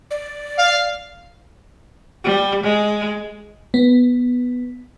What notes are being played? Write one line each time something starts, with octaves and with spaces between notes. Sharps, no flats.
D5
F5
G3
G#3
B3